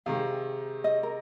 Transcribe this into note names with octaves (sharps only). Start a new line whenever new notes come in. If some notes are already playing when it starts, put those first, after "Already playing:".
C3 D#3 G#3 F5
D#5
A#4